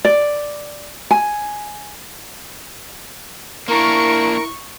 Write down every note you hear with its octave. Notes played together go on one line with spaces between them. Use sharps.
D5
G#5
A#3 D4 E4 A#4 C#6